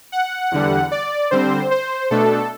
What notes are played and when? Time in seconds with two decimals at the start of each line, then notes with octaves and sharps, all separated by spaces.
0.12 F#5
0.51 E2 D3 G3
0.91 D5
1.31 D3 G3 C4 C5
1.71 C5
2.11 B2 A3 D4 A4